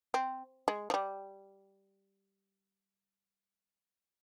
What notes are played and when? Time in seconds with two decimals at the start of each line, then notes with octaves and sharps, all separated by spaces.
0.14 C4
0.68 G#3
0.90 F3
0.94 G3